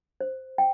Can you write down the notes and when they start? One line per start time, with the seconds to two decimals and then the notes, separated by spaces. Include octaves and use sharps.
0.21 C5
0.58 G5